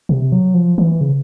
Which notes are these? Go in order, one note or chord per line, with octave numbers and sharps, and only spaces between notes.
C3
F#3
F3
E3
C#3